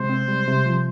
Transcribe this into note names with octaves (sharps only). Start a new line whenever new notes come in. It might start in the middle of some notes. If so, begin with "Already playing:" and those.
Already playing: C3 G#3 C5
C4
G3
C3
F3